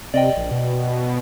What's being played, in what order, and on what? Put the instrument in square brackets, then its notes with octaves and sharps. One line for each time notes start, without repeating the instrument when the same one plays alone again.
[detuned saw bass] C3 [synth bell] D5 D#5 G5
[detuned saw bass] A#1
B2